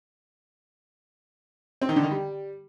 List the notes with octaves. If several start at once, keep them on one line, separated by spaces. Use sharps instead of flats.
C4
D#3
D3
D#3
G3